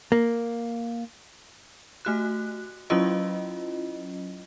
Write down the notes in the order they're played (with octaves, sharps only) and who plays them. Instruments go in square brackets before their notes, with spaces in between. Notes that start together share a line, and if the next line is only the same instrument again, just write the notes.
[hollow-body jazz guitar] A#3
[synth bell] A3 F#4 F#6
F#3 C#4 E4 F4 D#5